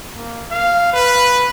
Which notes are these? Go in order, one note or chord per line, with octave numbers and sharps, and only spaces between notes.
A#3
F5
B4